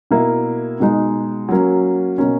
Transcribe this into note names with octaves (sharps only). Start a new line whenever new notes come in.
B2 A#3 E4
B2 G#3 D#4
F#3 A#3 C#4
B2 A#3 C#4